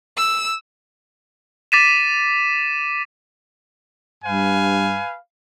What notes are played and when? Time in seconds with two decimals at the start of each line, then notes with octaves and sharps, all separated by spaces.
0.17 E6
1.72 D6 A6 B6 D#7 E7
4.24 G2 B4 F5 G#5